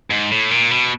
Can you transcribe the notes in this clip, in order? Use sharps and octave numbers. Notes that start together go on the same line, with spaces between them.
G#2
A2
A#2
B2